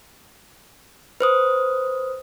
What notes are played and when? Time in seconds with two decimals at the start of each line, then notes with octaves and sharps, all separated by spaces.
1.21 B4 C5 D#6